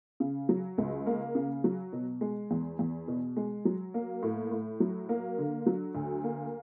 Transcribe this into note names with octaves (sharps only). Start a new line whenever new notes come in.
C#3
F#3
C#2
A#3
C#3
F#3
B2
G#3
E2
E2
B2
G#3
F#3
A#3
A2
A2
F#3
A#3
D3
F#3
D2
A#3